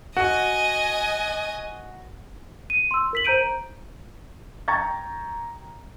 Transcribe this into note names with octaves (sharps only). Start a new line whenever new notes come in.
F#4 D#5 G#5
D#7
C6 E6
A#4 B6 F#7
C5 A#5 G6 D7 D#7
G5 A#5 C#6 G#6 A6